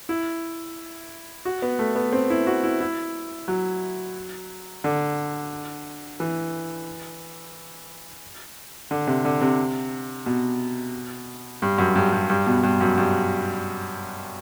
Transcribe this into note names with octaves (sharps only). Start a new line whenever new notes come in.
E4
F#4
B3
A3
B3
C4
E4
F#4
E4
E4
F#3
D3
E3
D3
C3
D3
C3
B2
G2
F#2
G2
G2
G2
B2
G2
F#2
G2